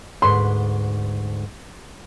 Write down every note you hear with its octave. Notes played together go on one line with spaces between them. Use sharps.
D2 G#2 B4 C6